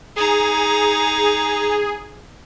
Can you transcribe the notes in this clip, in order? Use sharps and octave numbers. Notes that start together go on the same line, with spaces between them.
D#4 G#4 A#5